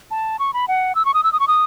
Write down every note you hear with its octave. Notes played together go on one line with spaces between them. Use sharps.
A5
C#6
B5
F#5
E6
C#6
D#6
E6
D#6
C#6
D#6